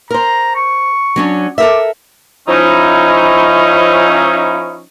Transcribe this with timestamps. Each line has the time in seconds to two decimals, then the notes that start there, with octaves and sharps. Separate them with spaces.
0.10 A#4 C5 A#5
0.56 C#6
1.16 F#3 C#4 D4
1.58 A4 A#4 E5 D6
2.48 F3 C#4 D#4 E4